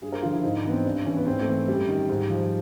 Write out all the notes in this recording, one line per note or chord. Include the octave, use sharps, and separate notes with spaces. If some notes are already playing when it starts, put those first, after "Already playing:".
G2 G#4
A#4
D3 F3 F4
E4
G#2 D#4
D4
E3 B3
C4
G2 D4
E3 C#4
B3
G#2 C4
A3
E3
F#2 G3
D#3
G#2
F3